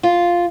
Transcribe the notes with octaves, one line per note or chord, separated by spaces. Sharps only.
F4